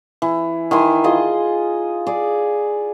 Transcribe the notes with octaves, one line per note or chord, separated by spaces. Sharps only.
E3
D#3 E3 G#5 C6
F4 G#4 D#5 C6
G#4 D5